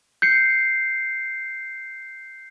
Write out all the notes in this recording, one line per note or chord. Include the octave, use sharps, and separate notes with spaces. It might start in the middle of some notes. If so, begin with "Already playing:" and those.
G6 C7 C#7